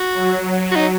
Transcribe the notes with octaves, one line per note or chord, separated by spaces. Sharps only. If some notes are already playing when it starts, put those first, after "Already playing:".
Already playing: F#4
F#3
F#4
D#4